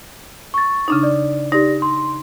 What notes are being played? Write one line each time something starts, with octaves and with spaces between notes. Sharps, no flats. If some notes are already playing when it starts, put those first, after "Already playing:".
C#6 A6
C#3 D4 D#4
D5
D#4 G4 D5 A#6
C6